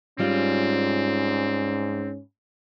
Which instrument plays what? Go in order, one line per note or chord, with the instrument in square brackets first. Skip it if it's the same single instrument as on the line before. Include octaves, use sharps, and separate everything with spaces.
[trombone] G#2 [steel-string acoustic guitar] G3 F4 D5 [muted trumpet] C4 [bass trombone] C#4